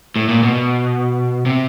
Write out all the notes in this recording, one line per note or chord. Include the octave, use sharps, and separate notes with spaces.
A2
A#2
B2
C3